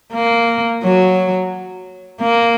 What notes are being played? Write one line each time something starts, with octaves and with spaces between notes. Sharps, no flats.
A#3
F#3
A#3